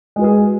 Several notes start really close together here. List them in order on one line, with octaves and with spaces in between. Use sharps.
G#3 F#4 B4 G#4